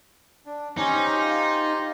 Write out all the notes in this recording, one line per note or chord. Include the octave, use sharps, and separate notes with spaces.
D4
C#4 D#4 G4 C5
F4